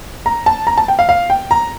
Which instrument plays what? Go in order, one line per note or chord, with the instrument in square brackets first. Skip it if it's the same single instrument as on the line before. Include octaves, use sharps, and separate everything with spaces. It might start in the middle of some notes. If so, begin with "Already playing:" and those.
[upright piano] A#5
A5
A#5
A5
G5
F5
F5
G5
A#5